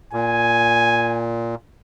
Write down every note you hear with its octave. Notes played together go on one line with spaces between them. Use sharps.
A#2 G#5